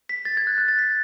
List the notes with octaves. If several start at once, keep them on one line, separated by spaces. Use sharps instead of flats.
B6
A6
G#6
F#6
F#6
A6
B6